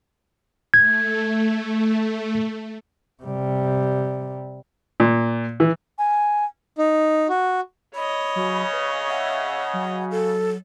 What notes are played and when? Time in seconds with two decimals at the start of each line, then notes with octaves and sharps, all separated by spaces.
0.74 A3 G#6
3.23 C3 G3
5.00 A#2
5.60 E3
5.99 G#5
6.78 D#4
7.29 F#4
7.95 C#5 D#5 B5
8.36 C#3 F#3
8.73 B4
9.08 E5 F#5
9.73 F#3
10.11 A4